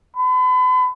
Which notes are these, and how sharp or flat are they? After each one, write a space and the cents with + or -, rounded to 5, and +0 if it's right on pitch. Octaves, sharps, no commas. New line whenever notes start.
B5 +40